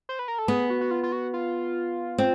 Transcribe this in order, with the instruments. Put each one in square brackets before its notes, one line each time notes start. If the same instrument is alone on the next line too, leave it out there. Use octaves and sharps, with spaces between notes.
[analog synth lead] C5
B4
A#4
A4
[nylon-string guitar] B3 [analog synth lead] G#4
[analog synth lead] F#4
F#4
F4
F4
F#4
F4
[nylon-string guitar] C4